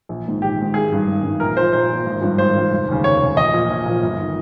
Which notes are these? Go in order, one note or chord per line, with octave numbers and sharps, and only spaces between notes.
A#1
G#2 D#3
A#1 G4
G#2 D#3
G#1 G#4
G2 D#3
G#1
G2 D#3
A#1 A#4
A#2 F3 C5
A#1 C5
A#2 F3
G#1
G2 F3
G#1 C5
G2 F3
F1
D#2 C#3
F1 C#5
D#2 C#3
A#1 D#5
A#2 F3
A#1
A#2 F3
G1
D#3